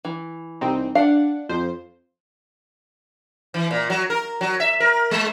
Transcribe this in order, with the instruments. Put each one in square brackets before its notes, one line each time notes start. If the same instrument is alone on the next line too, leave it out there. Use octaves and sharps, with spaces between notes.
[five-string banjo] E3
[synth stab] C2 C4 D#4
[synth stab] D4 F#5 [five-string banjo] F5
[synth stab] F2 F3 C5
[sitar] E3
A#2
F#3
A#4
F#3
E5
A#4
G#3